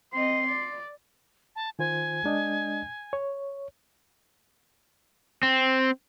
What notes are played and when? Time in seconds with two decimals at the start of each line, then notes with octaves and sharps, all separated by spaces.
0.13 C4 D#5 C6
0.46 D5
1.56 A5
1.79 D#3 F4 C5 G#5
2.24 G#3 D4 D#5
3.13 C#5
5.43 C4